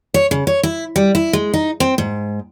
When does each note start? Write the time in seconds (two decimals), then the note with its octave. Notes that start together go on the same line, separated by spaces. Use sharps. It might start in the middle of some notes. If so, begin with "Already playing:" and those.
0.14 C#5
0.31 C#3
0.47 C#5
0.63 E4
0.96 G3
1.15 E4
1.33 G#3
1.54 D#4
1.80 C4
1.98 G#2